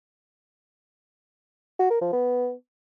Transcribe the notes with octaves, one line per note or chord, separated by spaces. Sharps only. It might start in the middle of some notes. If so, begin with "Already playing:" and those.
F#4
A#4
F3
B3